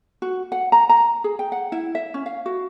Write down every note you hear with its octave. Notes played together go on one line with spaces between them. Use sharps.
F#4
F#5
A#5
A#5
G#4
G5
F#5
E4
E5
C#4
F5
F#4